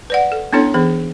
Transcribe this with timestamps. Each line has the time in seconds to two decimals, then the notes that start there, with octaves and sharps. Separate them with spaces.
0.10 B4 D5 F#5
0.32 A4
0.53 B3 C#4 D4 E4 A4 C#5
0.74 E3 B3 G#4